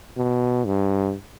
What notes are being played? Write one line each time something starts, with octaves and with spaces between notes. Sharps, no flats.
B2
G2